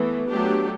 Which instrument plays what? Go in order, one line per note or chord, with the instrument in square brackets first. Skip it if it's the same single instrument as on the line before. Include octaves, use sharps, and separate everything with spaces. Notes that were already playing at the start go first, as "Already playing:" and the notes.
Already playing: [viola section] E3 A3 [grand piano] B3
[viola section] F#3 A3 D4 G4